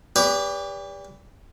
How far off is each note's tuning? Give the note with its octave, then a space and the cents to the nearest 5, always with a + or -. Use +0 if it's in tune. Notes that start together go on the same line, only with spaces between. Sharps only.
G4 +35 B4 +0 D5 -30